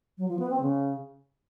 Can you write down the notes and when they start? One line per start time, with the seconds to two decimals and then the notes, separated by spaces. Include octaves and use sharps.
0.18 F#3
0.29 F3
0.39 B3
0.50 C4
0.61 C#3